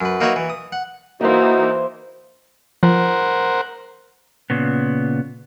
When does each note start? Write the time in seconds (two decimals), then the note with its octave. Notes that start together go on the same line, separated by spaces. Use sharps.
0.01 F#2 B4
0.21 A#3 D#4 F#4 B4 C#5 E5
0.36 E3
0.50 D#6
0.72 F#5
1.21 E3 A#3 D#4 E4 F#4 C5 E5
2.83 F3 A#4 C5 F#5
4.50 A#2 C#3 B3